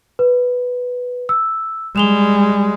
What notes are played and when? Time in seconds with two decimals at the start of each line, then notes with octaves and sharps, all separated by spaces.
0.19 B4
1.29 E6
1.96 G3 G#3 E7 F7 G7